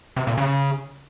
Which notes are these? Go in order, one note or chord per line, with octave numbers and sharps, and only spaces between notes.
C3
A#2
C#3